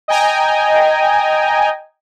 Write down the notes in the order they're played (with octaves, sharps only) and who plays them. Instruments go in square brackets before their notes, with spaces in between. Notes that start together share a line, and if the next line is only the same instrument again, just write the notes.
[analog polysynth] D#5 G5 G#5 A#5